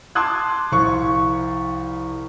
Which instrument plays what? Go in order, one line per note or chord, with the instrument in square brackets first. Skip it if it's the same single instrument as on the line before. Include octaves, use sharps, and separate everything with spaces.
[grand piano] A5 C6 D6 D#6 F#6 G#6
C2 F3 C#6